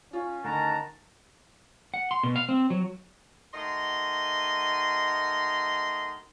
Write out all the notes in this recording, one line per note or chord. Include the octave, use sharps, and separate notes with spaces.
C#4 F4
D2 D#3 A5 A#5
F#5
C6
B2
F5
C4
F#3
D#3 A3 F#4 D#5 C6